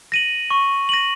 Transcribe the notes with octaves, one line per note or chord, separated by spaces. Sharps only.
A#6 D#7 F#7
C#6
A#6 D#7 F#7